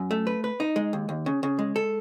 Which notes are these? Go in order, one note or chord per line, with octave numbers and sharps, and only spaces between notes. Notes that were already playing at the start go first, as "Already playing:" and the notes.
Already playing: F#2
A3
B4
B4
D#4
G#3
D#2
D#2
C#3
C#3
G#3
A4